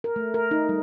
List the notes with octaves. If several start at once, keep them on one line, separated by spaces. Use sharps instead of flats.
A#4
A3
A#4
D#4
G3